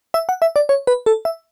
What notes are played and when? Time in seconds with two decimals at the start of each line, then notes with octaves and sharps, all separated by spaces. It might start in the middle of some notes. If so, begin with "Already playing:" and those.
0.14 E5
0.29 F#5
0.42 E5
0.56 D5
0.69 C#5
0.87 B4
1.06 A4
1.25 E5